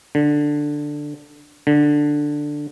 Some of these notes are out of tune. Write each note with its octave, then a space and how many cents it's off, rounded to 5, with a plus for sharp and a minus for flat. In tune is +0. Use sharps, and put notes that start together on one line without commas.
D3 +5
D3 +5